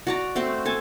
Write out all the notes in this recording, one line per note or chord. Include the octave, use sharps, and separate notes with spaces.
F#4 D5 A#5
A3 C4 F#4 C5
A4 G#5 A5